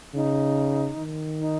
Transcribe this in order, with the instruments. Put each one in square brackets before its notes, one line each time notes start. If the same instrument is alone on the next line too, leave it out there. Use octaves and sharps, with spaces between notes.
[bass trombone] C#3 [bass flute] D#4
[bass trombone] D#3
[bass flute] D#4